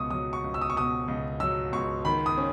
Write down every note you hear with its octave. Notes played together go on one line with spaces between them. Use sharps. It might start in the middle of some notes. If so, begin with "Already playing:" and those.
Already playing: C#2 B2 C#6 D#6
F#3 D#6
C#6
C#2
E6
D#6
C#6
B2 D#6
C#2
F#3 E6
C#2 C#6
D#3 B5
D#6
C#4